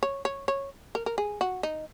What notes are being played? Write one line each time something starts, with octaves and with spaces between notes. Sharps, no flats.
C#5
C#5
C#5
A#4
A#4
G#4
F#4
D#4